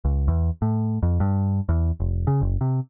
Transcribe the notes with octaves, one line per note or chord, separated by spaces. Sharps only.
C#2
E2
A2
F2
G2
E2
F1
C#3
F#1
C3